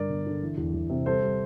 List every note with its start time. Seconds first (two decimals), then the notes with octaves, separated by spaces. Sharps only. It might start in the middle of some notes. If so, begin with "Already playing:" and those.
Already playing: G2 D3 A#4 D5
0.09 G1
0.26 D3
0.42 E3
0.57 E2
0.73 E2
0.90 C3
1.06 G3 A4 C5
1.22 G3